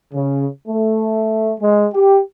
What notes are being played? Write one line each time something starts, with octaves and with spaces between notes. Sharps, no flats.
C#3
A3
G#3
G4